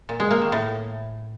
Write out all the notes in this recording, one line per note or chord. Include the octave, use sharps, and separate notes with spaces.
A#2
G#3
A#3
D#3
A2